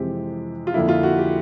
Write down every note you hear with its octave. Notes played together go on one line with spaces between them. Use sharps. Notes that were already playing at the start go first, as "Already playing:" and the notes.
Already playing: F2 C3 E3 G#3 C4 G4
F4
F2 D3 F3 A#3 E4
F4
F#4
G4